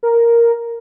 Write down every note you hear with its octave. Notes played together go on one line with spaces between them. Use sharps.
A#4